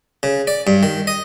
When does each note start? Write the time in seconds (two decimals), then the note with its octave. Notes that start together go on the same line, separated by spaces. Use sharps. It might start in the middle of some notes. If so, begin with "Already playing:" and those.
0.23 C#3
0.47 D5
0.67 G2
0.83 D#3
1.07 D#5